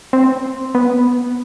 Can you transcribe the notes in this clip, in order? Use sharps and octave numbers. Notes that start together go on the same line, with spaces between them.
C4
B3